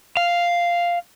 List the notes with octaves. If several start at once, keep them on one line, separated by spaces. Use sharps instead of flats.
F5